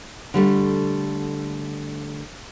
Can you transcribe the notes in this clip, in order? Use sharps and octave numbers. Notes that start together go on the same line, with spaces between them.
D3 G3 A3